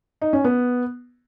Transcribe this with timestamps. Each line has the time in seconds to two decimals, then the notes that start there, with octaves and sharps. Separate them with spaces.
0.22 D#4
0.33 C#4
0.44 B3